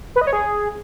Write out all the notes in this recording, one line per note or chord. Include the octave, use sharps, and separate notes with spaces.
B4
D#5
C#5
G#4